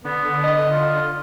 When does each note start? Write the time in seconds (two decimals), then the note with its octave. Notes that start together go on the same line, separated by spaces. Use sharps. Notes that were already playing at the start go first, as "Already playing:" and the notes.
0.05 D3 B3
0.44 D#5
0.72 F4